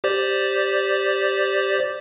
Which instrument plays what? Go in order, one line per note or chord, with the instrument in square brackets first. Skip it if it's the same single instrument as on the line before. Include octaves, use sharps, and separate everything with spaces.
[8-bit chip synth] G4 C5 D5